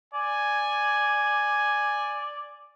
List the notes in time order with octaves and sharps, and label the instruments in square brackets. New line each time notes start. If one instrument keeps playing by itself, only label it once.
[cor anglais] D5 [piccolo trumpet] G#5